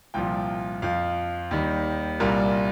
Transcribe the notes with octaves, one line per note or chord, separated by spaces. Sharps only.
C2 A#2 F3 G5
F2 F3 F5
D#2 D#3 G3
C2 A#2 G3 A#4